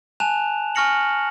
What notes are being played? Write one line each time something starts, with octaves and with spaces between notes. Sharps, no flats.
G#5 A5 F#6 E7 F7
G#5 C#6 F6 A#6 C#7 F#7